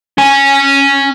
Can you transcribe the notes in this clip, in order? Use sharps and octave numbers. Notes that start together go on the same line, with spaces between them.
C#4 G#5